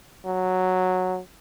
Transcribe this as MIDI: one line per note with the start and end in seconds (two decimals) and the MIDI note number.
0.26 1.19 54